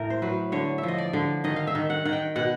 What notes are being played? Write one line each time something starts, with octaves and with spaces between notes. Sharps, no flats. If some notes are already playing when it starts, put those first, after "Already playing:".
Already playing: A2 A#4
C5
F#3 B4
D3 C#5
E5
F3 D#5
D5
D3
D#3 D#5
F5
E5
D#3
F#5
D#3 F#5
G5
B2 F#5